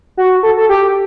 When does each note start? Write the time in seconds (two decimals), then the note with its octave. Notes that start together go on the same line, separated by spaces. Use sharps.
0.17 F#4
0.43 A4
0.57 A4
0.69 G4